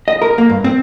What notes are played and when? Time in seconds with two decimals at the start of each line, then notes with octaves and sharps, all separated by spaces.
0.08 D#5
0.22 A#4
0.38 A#3
0.49 G2
0.64 C4